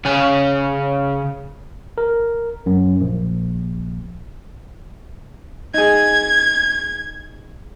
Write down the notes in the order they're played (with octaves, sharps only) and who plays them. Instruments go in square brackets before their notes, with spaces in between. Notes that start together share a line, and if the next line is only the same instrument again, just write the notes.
[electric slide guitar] C#3 G#5
[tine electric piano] A#4
F#2
A#1
[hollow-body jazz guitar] D#4 G#4 [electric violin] G#6